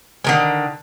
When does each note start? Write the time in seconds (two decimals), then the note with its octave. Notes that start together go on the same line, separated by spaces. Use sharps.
0.24 D3 D#3 G#3